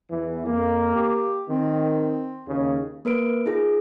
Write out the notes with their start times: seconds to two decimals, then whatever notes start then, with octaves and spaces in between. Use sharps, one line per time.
0.11 E2 E3
0.47 F2 A#3
0.94 G4
1.49 D#3 C4
2.47 D#2 C#3
3.05 A#3 A#4 B4 D7
3.46 D#4 F4 G#4